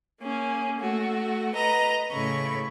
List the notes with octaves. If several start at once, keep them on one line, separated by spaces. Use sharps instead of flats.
A#3 C#4 G#4
A3 F#4
B4 D#5 A#5
A2 C#3 A3 B5 C#6